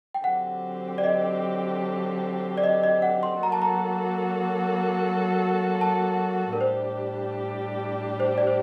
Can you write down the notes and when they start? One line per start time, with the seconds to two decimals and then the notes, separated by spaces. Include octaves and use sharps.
0.14 G5
0.24 D3 F#3 C4 G4 F#5
0.98 D5
1.04 D#5
2.58 D5
2.64 D#5
2.84 D#5
3.02 F#5
3.23 C6
3.43 F#3 A#3 F#4 A4 A#5
3.52 A5
3.62 A#5
5.81 A5
6.53 A#4
6.61 A2 G3 D4 G4 C5
8.20 C5
8.38 D5
8.47 C5